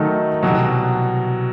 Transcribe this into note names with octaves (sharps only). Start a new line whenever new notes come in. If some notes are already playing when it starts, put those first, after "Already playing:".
Already playing: D#3 F#3 A3 D#4
C2 B2 F#3